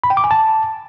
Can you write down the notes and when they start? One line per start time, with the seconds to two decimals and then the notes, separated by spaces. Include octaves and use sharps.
0.04 B5
0.10 G5
0.17 D6
0.24 G#5
0.31 A5